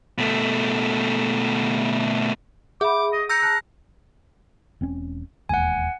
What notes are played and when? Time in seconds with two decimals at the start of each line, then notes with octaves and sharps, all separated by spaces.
0.18 B2 A3
2.81 G#4 E5 B5 D6
3.13 D#5 D#7
3.29 A#5 E6 G6 C#7
3.42 A5 F6 F#6
4.81 E1 C4 C#4
5.49 E1 D#2 F#5 G#5